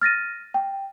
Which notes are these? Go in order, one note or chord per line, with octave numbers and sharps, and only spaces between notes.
F6 A6 A#6 D#7
G5